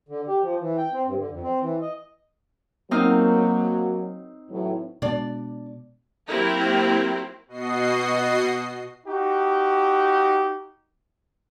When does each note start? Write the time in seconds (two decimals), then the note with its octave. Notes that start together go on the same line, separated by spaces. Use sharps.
0.09 D3
0.27 G4
0.43 F3
0.60 E3
0.78 G5
0.93 C4
1.06 G2
1.18 D3
1.30 F2
1.43 C4
1.61 E3
1.81 D#5
2.91 F#3 A#3 C4 D#4 F6
4.50 A2 E3 F#3
5.02 B2 G#3 B3 D4 D5
6.28 F#3 A#3 C4 E4 G4 A#4
7.48 B2 F#4 D#5 C7
9.06 D#4 F#4 G4